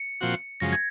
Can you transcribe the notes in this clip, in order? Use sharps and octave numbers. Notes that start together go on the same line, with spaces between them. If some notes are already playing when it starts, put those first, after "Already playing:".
Already playing: C#7
A#2 F3 C4 F#4
F#2 C#3 F3 G#3 A#6
G#6